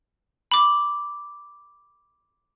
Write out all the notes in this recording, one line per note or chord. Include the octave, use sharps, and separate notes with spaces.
B5 D6